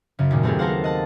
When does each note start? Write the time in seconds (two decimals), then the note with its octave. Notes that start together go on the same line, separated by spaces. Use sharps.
0.19 F#2 C#3
0.31 D#2 A#2
0.43 A3 B3 C4 F4 G4 G#4
0.59 A4 A#4 C5 F5 F#5
0.84 D#5 F#5 A5